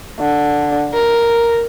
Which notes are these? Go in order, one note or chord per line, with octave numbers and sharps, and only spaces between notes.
D3
A#4